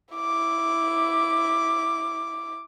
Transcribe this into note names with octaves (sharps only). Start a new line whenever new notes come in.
E4 D6